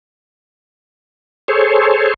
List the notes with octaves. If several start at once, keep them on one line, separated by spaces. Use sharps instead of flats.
G#4 A4 C5 C#5